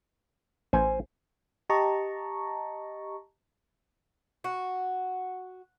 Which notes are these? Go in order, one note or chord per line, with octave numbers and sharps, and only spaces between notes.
A1 C5 G#5
G4 D#5 A5 A#5 C#6
F#4